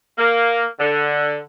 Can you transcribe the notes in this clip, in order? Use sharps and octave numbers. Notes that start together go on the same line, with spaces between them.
A#3
D3